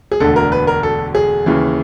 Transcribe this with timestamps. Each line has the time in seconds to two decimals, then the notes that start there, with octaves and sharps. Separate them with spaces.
0.12 G#4
0.20 E1 D2 D3 A4
0.36 A#4
0.52 B4
0.67 A#4
0.83 A4
1.15 G#4
1.46 D#2 C#3 E3